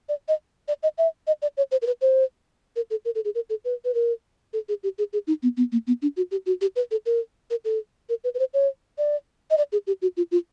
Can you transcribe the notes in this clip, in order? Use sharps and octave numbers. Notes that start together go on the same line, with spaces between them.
D5
D#5
D5
D#5
E5
D#5
D5
C#5
C5
A#4
B4
C5
A#4
A4
A#4
A4
G#4
A#4
A4
B4
B4
A#4
A4
G#4
G4
G#4
G#4
D#4
B3
B3
A#3
B3
D4
F#4
G4
F#4
G4
B4
A4
A#4
A#4
A4
A#4
B4
B4
C5
C#5
D5
D#5
D5
G#4
G4
F#4
F4
F4